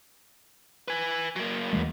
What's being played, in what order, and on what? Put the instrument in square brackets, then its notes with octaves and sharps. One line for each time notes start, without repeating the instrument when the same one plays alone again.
[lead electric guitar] B4 G#5
F#3 A#3
[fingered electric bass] D#2 E3 G#3